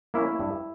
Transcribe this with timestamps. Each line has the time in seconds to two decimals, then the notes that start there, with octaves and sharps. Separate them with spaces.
0.14 A#3 C#4 E4
0.39 G2